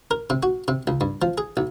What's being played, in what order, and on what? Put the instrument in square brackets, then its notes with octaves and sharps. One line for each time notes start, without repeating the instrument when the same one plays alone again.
[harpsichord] A#4
C3
F#4
C3
C#2
G2
F3
G#4
B1